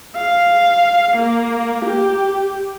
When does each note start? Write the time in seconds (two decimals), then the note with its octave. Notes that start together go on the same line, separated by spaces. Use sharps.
0.16 F5
1.17 A#3
1.85 G4